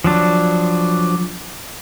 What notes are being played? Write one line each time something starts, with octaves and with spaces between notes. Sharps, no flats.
F3 F#3 D4